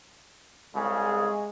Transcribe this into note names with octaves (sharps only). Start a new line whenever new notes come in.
C2 C#3 G#3 G#4